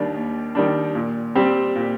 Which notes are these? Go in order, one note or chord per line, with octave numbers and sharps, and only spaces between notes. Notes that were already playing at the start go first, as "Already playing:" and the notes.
Already playing: D#2 D#3 G3 D4
D#2
D#3 G3 D4
A#2
G3 C4 G4
A#2